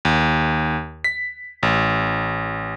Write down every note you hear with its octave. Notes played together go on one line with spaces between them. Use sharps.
D#2
B6
A1